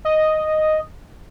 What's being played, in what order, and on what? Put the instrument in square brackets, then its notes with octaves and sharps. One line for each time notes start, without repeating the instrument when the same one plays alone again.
[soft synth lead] D#5